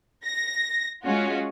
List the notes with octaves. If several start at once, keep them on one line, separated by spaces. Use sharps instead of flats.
A#6
G#3 C#4 F4 F#4